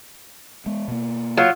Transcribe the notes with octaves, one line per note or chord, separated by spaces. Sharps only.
G#3 B3
B2 A#3
F#3 F4